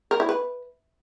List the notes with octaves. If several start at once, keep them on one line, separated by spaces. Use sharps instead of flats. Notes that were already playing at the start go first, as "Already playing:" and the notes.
A#4
E4
B4